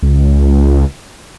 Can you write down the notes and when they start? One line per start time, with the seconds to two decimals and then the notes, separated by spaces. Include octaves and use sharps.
0.02 C#2